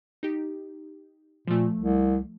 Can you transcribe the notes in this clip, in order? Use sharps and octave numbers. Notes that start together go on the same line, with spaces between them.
D#4 G4
A#2 F3 A3
C2